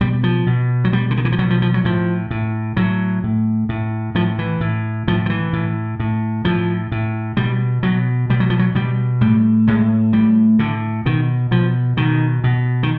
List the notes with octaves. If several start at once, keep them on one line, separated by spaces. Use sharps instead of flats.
B2 G3
F3
B2
F#3
B2 G3
D3
D#3
E3
F3
B2 F#3
F3
F3
F#3
A2 F3
A2
A2 F#3
A2
A2
A2 F3
E3
A2
A2 F3
F3
E3
A2
A2
A2 F3
A2
B2 G3
B2 F#3
B2 G3
F#3
F3
F#3
B2 G3
A2 G3
A2 G#3
A2 G3
A2 D3
B2 D#3
B2 F3
B2 D#3
B2
D#3